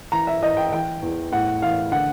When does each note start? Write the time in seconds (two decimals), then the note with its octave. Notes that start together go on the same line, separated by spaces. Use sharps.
0.12 E3 A#5
0.27 E5
0.42 E3 D#5
0.57 G5
0.72 E3 G5
1.02 E2
1.32 A2 F#5
1.62 E3 F5
1.91 D3 F#5